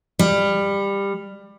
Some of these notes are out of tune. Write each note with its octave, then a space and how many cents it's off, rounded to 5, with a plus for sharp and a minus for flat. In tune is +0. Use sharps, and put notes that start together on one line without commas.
G3 +20